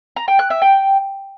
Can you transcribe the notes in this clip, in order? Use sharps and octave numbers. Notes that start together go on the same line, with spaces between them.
A#5
G5
F#6
E5
G5